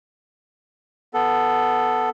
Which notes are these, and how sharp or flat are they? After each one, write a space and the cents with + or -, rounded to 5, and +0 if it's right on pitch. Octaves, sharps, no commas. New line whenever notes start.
B3 +0 A4 +0